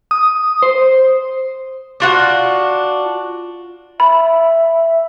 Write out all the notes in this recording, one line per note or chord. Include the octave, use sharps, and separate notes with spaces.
D#6
C5
D4 F4 F#4
E5 B5